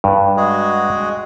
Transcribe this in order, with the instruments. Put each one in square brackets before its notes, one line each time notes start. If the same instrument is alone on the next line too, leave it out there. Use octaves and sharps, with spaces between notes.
[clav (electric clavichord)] G2
[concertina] G#3 F#4 G#4